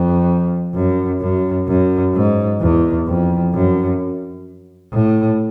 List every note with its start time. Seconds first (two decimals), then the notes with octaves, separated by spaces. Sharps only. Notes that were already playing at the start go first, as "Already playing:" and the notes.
Already playing: F2
0.75 F#2
1.21 F#2
1.68 F#2
2.14 G#2
2.61 E2
3.07 F2
3.54 F#2
4.93 A2